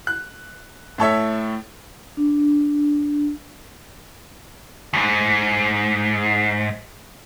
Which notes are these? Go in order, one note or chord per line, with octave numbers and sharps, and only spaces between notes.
F#6
A2 A4 C#5 E5
D4
D#2 G#2